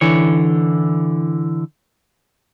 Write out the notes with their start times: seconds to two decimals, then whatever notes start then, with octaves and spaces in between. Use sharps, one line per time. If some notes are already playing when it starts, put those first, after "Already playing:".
0.01 D3 E3 C#5